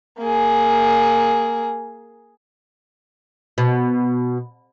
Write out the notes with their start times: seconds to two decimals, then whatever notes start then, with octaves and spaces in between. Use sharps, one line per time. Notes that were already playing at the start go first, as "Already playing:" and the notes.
0.19 A#3 G#4
3.58 B2